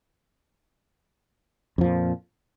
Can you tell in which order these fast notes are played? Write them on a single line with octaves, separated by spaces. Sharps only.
F2 F3 A#2